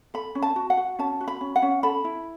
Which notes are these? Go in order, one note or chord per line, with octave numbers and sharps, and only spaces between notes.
A4 B5
C#4
A5
F#4
F#5
F#4
C#4 A5
F#4
B5
C#4
F#5
C#4
A4 B5
E4